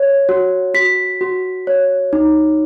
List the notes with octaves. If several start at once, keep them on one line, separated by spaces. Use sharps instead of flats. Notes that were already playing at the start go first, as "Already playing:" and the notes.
Already playing: C#5
F#4
F#4 B6
F#4
C#5
D#4